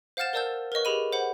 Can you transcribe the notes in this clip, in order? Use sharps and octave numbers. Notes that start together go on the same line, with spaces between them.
C5 F5 F#5 F6 A6 E7
A#4 C5 D5 A5 E6 G6
A#4 B4 C#5 D#5 C#6
G4 G#4 B5 D#7
C5 F#5 B5